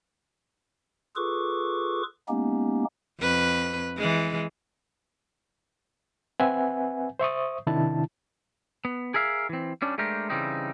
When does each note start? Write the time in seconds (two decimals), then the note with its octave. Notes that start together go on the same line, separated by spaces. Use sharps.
1.16 F4 G#4 A4 B4 C#6 D6
2.28 G#3 A#3 B3 C#4 D#4 G4
3.20 F2 B4
3.97 E3 G#3
6.40 C4 B4 E5 F#5 G#5
7.19 C5 E5 C#6 D#6
7.67 C3 D#3 D4 E4 A5
8.85 B3
9.14 G#4 A#4 E5 F5
9.49 E3 C4
9.82 G3 C#4 D4
9.98 G#3 A3 D4 G4 A#4 C5
10.30 C#3 E3 G3 C4 D#4